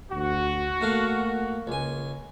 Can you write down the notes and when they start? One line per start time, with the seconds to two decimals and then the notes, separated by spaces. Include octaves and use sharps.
0.12 D2 F#4
0.81 A3 A#3 A#4 F5
1.67 C#2 G#5